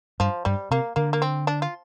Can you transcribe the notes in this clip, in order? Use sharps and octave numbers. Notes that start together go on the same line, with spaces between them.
G2 F3
G2 G3
C3 A#3
D3 A#3
A#3
C4
D4
F4